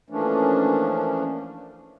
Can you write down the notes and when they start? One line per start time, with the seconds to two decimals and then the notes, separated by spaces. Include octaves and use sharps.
0.10 E3 F3 A3 A#3 C#4 D4